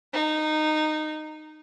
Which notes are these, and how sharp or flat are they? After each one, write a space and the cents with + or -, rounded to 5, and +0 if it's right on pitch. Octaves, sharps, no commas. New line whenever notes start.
D#4 -15